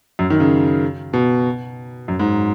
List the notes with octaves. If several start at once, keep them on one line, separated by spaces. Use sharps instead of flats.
F#2
D#3
C#3
B2
F#2
G#2